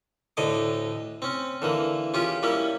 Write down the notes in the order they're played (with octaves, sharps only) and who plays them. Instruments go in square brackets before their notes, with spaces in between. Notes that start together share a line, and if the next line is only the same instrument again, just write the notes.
[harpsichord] D2 A2 D3 D#5 D6
C4 C#4
D3 E3 A#3
C#4 F4 G4 G#4
G3 A#3 C#4 E4